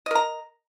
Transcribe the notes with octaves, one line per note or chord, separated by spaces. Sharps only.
A#4 D#5 A#5